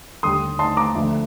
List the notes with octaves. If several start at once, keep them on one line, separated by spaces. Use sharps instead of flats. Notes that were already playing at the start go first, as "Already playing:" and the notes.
D#2 D3 G3 C6 D#6
A5 C6
A#5 D6
D2 D3 F3 A3